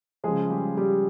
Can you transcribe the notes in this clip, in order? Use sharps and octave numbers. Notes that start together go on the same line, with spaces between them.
C#3 F3 G#3 G#4
G3 G4
G3 G4